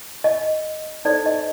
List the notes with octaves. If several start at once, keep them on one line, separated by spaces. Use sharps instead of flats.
D#5
D#4 A4 C5 D5
D#5